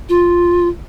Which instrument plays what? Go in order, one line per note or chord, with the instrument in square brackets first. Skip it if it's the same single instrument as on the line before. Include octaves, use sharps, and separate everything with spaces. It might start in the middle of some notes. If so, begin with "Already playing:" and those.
[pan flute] F4